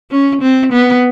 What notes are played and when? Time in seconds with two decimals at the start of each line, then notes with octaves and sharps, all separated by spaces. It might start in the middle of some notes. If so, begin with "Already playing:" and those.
0.11 C#4
0.42 C4
0.73 B3